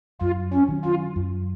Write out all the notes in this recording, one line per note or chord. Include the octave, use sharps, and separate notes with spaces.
F#2 F4
C#4
D#3 F#3
F4
F#2